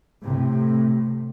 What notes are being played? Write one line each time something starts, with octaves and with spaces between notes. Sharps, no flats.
A2 C3